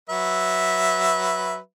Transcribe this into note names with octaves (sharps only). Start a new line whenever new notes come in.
F#3 B4 E5